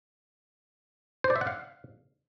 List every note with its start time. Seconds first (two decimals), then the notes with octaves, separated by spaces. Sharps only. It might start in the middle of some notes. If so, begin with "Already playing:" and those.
1.24 C5
1.30 D5
1.36 E5
1.41 F#5
1.47 F5